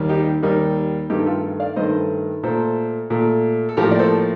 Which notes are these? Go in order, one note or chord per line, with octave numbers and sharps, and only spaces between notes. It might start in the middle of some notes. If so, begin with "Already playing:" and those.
Already playing: D#2 D#3 G3 A#3
D#4 G4
D#2 D#3 G3 A#3 D#4
G2 D#3 A3 D#4 G4
F4 A4
D5 F5
G2 D#3 A3 C5 D#5
A#2 A3 A4 C5
A#2 A3
A4
A2 F3 A#3 G4 A#4
D5
A4 C5